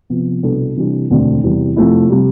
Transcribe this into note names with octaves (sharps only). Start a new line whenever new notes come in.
C3 F3 B3
C2 B2 B3 D4 A4
C3 E3 G3 D4
E1 D2 D3 A3 C4
E2 C3 G3
F2 C3 F3 A3 E4
C3 G3